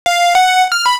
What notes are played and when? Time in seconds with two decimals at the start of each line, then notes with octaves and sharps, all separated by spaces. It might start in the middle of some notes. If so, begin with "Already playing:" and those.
0.06 F5
0.35 F#5
0.72 F6
0.86 B5